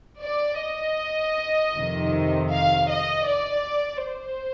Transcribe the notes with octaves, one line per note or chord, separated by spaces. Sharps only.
D5
D#5
F2 C3 D#3
F5
D#5
D5
C5